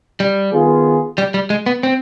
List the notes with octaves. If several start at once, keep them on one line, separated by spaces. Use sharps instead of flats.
G3
D#3 B3 F4 G#4
G3
G3
G#3
B3
C4